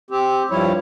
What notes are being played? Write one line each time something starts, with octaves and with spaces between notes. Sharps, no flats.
C4 G4
G2 F3 G3 E4 C#5